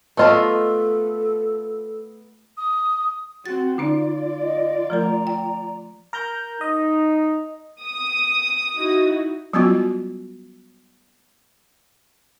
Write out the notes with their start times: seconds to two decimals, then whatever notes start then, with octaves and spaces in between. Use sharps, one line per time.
0.17 A3 B3 F4 A4 D#5 A5
2.57 D#6
3.46 C4 F#4 A6
3.78 D3 C#4 D#4 F4 D5
4.42 D#5
4.90 F3 A3 A#4 A#5
5.27 G5
6.13 A#4 A#5 G6
6.61 D#4 D#5
7.82 D#6
8.75 D#4 E4 F#4
9.53 F#3 G3 B3 C#4 F4 F#4